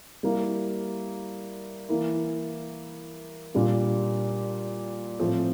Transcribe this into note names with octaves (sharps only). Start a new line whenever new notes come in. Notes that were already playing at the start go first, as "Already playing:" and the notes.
G3 A#3 E4
E3 A#3 E4
A#2 G3 D4 F4
A2 F3 C4